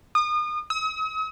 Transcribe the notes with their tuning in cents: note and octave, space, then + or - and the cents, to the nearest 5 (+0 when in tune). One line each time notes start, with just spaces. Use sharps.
D#6 -35
D#6 +45